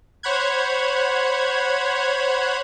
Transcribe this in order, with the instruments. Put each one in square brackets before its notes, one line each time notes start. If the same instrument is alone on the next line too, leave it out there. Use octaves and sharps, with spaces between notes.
[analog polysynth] C5 C#5 F#5 B5 F#6 G#6